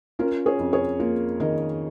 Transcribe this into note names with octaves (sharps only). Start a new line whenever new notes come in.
C#4 F4 A#4
G#4 C#5
F2
G#4 C#5
A#3 F4 A#4
D#3 A#4 D#5